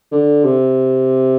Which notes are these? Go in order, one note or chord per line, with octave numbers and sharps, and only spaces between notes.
D3
C3